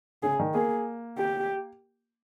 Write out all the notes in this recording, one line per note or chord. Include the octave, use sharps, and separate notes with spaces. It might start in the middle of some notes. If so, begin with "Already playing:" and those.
C#3 G#4
D#3
A#3 G#4
G4